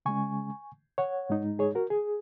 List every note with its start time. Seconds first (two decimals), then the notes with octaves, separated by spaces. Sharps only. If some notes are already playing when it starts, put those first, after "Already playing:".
0.06 C#3 G#3 C#4 G#5 C#6
0.98 C#5 F#5
1.29 G#2 G#3 D#4
1.59 G#4 C#5
1.75 F#4 A#4
1.90 G#4